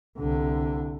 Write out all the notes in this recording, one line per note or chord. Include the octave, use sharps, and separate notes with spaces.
C2 D3